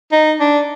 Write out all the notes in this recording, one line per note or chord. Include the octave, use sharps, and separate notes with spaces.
D#4
D4